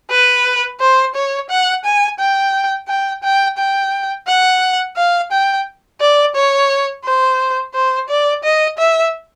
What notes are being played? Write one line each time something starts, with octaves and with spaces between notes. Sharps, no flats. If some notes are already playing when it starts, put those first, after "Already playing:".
B4
C5
C#5
F#5
G#5
G5
G5
G5
G5
F#5
F5
G5
D5
C#5
C5
C5
D5
D#5
E5